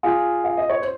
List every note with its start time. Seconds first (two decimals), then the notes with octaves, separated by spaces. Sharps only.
0.03 F4 G#4
0.44 F5
0.57 D#5
0.70 C#5
0.82 C5